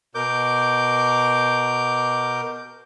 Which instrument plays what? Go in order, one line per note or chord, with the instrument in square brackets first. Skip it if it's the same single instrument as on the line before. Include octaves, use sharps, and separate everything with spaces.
[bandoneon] B2 A#4 D6 G6